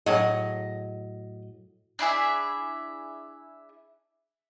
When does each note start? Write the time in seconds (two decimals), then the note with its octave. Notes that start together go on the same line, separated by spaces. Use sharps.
0.06 A2 F#3 G#4 D#5
1.99 D4 E4 G#4 E5